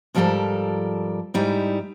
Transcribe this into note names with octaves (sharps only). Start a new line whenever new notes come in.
G#2 F3 G3 F4 A4 A#4
G#2 G3 D#4 E4